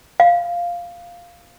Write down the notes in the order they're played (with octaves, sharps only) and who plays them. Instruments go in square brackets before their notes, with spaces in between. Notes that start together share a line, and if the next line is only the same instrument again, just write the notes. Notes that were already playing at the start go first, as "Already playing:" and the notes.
[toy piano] F5